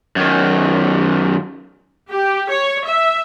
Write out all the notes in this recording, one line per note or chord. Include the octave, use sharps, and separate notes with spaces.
F#2 D#3
G4
C#5
E5